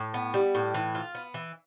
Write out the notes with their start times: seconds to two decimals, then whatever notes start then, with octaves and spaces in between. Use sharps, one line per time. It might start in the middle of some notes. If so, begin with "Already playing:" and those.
Already playing: A2
0.14 B3
0.34 G3
0.55 A2
0.74 E3
0.95 F4
1.15 B3
1.34 E3